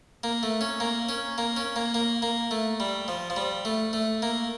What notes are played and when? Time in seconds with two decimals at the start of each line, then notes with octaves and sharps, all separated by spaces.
0.24 A#3
0.43 A3
0.61 C#4
0.80 A#3
1.09 C#4
1.38 A#3
1.57 C#4
1.76 A#3
1.94 A#3
2.22 A#3
2.51 A3
2.80 G3
3.08 F3
3.30 F3
3.36 G3
3.65 A3
3.93 A3
4.22 A#3